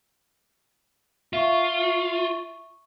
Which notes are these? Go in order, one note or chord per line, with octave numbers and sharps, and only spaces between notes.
F4 E5 C#6